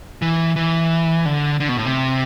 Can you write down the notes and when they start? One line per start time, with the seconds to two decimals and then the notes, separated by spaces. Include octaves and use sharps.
0.22 E3
0.56 E3
1.25 D3
1.60 D3
1.69 B2
1.77 A2
1.85 C3